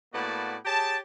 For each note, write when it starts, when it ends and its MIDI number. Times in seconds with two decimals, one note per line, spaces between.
0.13 0.56 45
0.13 0.56 58
0.13 0.56 59
0.13 0.56 66
0.13 0.56 74
0.13 0.56 81
0.65 0.97 67
0.65 0.97 68
0.65 0.97 73
0.65 0.97 81